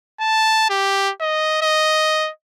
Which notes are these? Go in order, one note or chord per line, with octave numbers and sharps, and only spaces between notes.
A5
G4
D#5
D#5